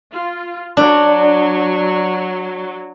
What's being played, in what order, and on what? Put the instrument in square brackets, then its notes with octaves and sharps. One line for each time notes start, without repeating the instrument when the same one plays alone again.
[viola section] F4
[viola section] F#3 [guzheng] D4